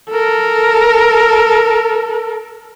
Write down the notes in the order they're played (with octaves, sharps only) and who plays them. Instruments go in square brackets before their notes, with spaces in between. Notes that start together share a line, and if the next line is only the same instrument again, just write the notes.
[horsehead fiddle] A4 A#4